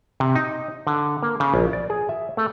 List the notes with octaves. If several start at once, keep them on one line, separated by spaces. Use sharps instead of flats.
C3
D#4
D3
A#3
C#3
A#1
D5
G#4
E5
A3